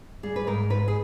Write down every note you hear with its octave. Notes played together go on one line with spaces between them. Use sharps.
G3 G#4
B4
G#2 A#4
G#2 B4
G#4